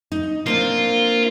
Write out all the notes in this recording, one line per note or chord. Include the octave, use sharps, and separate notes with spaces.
D#4
A#3 C4 D4 F4